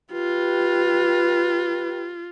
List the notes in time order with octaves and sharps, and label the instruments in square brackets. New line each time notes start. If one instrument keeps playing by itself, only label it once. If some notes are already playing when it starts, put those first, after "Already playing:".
[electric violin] F4 [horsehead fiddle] G4 B4